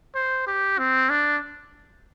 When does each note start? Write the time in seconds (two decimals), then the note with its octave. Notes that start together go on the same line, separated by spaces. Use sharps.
0.15 C5
0.47 G4
0.79 C4
1.10 D4